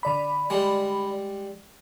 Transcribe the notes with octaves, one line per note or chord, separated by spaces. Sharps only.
D3 D5 B5
G3 G#3